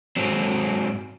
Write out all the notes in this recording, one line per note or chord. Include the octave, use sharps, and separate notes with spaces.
G#2 F#3 C4